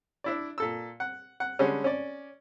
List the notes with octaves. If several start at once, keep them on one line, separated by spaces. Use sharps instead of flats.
D4 E4 D5
A#2 A4 E6
F#5
F#5
D3 G3 G#3 C#4
C#4 D5